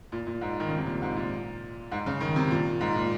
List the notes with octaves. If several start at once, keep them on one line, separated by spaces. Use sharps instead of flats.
A#2
A#2
G#2
D#3
C#3
C3
A#2
G#2
A#2
G#2
C#3
D#3
C3
A#2
G#2
A#2